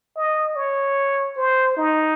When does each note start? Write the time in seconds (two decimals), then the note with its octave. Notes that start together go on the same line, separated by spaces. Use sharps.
0.16 D#5
0.56 C#5
1.37 C5
1.77 D#4